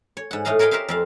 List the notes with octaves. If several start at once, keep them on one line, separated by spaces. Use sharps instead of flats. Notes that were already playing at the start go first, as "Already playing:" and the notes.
C#5
G#2 F#5
A2 A3 D#5 F5 A#5
A#4 C#5 D#5 F5 G5 B5
G4 A#4 C5 E5 F5
F2 C4 F5